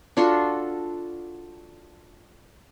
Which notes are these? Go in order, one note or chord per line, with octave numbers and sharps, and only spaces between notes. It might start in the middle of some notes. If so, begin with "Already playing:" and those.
D4 F4 F#4 A4